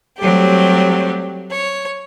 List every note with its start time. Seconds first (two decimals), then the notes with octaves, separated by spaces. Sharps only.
0.19 F#3 G3 A3 C4 G4
1.51 C#5